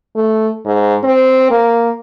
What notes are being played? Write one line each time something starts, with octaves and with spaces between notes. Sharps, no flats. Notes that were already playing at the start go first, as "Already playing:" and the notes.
A3
G#2
C4
A#3